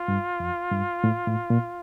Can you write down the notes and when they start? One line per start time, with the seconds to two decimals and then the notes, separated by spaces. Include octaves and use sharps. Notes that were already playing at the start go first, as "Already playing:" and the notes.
Already playing: F4
0.08 G2
0.40 F2
0.72 G2
1.04 A2
1.28 A2
1.50 A#2